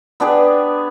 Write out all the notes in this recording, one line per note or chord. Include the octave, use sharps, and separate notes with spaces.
B3 D4 G4 G#4